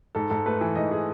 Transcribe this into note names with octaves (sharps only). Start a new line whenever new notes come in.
G#2 A4
G#2 A4
A3 B4
E3
G#2 D#5
G#4